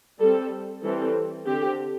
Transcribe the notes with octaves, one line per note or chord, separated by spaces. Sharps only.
G3 C4 A4
E3 G3 C4 A4
D3 C4 G4